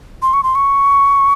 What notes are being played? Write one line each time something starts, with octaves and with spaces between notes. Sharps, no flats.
C6
C#6
C6
C#6